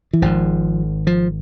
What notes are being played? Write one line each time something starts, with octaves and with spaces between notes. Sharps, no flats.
E3
G#1 G#2 F3
F3